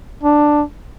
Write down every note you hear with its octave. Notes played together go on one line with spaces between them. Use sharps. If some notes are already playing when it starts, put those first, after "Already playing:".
D4